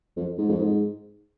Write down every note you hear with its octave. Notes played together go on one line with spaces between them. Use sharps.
F2
G#2
F2
G#2